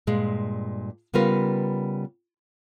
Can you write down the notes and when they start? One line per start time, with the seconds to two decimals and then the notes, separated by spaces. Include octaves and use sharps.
0.07 G2 A#2 G#3
1.14 C#3 G3 B3 F4 A#4 B4